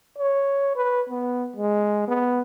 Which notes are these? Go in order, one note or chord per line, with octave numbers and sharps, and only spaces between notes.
C#5
B4
B3
G#3
B3